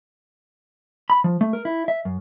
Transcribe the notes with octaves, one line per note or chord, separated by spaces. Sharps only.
B5
F3
A3
A#4
E4
E5
F#2